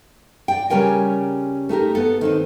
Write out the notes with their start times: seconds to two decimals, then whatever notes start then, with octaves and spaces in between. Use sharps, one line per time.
0.48 D5 G5
0.70 C#3 G3 C#4 A#4 G5 G#5
1.69 A3 D#4 G4 A#4
1.95 B3 A4
2.21 D#3 C4 D#4